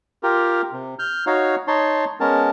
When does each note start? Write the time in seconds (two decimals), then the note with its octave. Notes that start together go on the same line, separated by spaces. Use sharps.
0.23 F4 G4 A#4
0.72 C3
0.99 F6 G6
1.27 D#4 F#4 C#5 F5
1.68 D#4 C#5 A5 C6
2.20 G#3 B3 C#4 A#4 A5